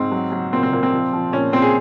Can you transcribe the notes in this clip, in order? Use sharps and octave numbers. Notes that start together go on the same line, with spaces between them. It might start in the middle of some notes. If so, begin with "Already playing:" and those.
Already playing: G#2 C4
F#3
F#3
A#2 C4
C4
A#2 A#3
C4
F3
F3
A#2 C#4
A#2 C4
G#4